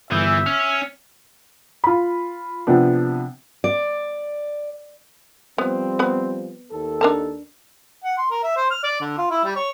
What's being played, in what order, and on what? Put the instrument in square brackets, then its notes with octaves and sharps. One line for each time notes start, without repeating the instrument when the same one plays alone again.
[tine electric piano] G1 D#6 G6 [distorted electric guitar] E3 [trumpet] E5
[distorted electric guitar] C#4 [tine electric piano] F6
[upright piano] F4 B5
C3 F3 B3 D4
[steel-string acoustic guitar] D5
[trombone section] F3 G3 C4 [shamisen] B3
[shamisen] B3 B5
[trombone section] D#2 D#3 A4
[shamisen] D4 A#4 A5
[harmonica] F#5
C6
A#4
E5
C5
F6
D5
D3
F4
E4
G3
C#5